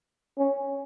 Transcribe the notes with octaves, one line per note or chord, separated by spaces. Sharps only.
C#4